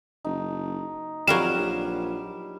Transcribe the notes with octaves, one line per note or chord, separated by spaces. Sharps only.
F#1 D#4
F2 F#3 G3 A#4 F5 E7
A#1